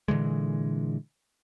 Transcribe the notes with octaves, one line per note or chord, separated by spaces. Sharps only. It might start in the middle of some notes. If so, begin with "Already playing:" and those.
A#2 D3 E3 G#3